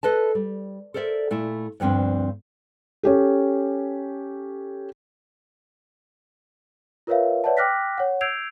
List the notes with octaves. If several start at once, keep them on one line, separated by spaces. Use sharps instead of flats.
A4 B4 D#5 A5
G3
A4 A#4 C5 D5 E5
A#2 A3 E4
D2 G2 F3 C4 D4
C#4 G4 A4
F4 A#4 B4 C#5 E5 F5
B4 C#5 D5 E5 F#5 A5
G5 D6 F6 F#6 A#6 B6
C#5 F#5
E6 G6 G#6 C7 D7 F7